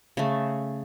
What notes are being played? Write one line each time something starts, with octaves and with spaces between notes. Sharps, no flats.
C#3 A3